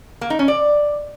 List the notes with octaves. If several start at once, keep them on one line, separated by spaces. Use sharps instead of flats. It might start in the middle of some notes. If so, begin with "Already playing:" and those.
A#3
D#4
C#4
D5